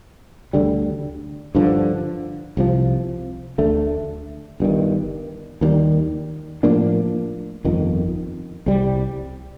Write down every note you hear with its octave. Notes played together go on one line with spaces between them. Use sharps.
D2 D3 G3
G2 D3 F3
C2 C3 F3
D2 D3 A3
G1 G2 D#3
D#2 D#3 G3
A2 F3 A#3 D4
G1 F2 D#3
C2 C3 G3